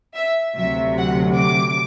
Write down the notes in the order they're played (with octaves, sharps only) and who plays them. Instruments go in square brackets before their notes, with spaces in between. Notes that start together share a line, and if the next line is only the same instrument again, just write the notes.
[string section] E5
D2 C3 F#3 E5
F#5
D6